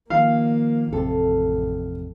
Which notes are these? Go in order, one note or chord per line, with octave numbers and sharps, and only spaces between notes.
D#3 F3 A#3 F5
A1 F2 C3 A4